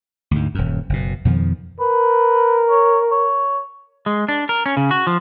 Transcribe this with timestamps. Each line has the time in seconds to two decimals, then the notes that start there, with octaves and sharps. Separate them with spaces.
0.31 D2 G#2
0.55 D#1 F#2
0.89 F#1 B2
1.25 F2 B2 D#3 F3
1.80 A#4 B4
2.70 C#5
3.12 C#5
4.06 G#3
4.28 D4
4.49 A#4
4.66 C#4
4.77 C#3
4.91 F#4
5.07 F3